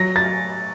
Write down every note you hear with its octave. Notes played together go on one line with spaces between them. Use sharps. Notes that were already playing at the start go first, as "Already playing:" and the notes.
Already playing: F#3 A#6
A6